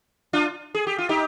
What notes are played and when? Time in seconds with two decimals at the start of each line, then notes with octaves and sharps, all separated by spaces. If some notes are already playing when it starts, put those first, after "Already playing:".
0.33 D4 F4
0.75 G#4
0.87 G4
0.98 F4
1.09 D#4 G4